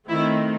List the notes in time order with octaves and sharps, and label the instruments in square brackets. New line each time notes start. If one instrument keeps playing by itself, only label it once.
[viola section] D#3 A3 C4 E4